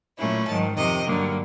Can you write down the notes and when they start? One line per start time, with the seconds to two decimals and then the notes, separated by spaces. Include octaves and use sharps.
0.18 A#2 F#3 A3 C#4 E4
0.47 G#2 D#3 F#3 A5
0.75 F2 C3 D#3 D#5
1.04 G2 D3 F#3 A#3